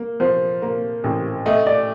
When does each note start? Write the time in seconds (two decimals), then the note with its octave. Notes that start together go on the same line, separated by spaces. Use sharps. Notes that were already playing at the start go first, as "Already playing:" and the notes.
Already playing: A#3
0.20 F3 C5
0.62 A#3
1.04 A1
1.46 A3 D#5
1.67 D5